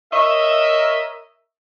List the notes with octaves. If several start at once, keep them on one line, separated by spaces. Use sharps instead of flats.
A#4 C#5 D#5 E5